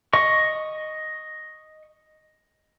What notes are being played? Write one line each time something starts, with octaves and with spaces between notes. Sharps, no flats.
D#5 C#6